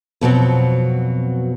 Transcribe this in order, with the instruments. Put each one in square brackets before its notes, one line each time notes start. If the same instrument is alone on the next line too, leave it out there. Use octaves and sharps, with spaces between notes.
[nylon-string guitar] F2 B2 F#3 C4